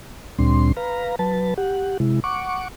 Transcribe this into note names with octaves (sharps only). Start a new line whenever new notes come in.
D2 A#2 G3 C4 D4 C6
B4 F5 A#5
F#3 B4 A5
G4 F#5
C3 G#3 E4
F#5 C#6 D6